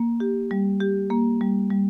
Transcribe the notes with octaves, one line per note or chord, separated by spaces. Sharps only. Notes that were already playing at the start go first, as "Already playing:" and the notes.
Already playing: A#3
G4
G3
G4
A#3
G3
G3